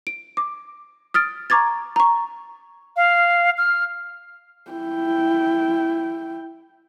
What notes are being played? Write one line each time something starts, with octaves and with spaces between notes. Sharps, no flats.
D7
D6
D#6 F6 A6 D7
A#5 C#6 D6 G#6 A6
A#5 C#6
F5
F6
E4 G5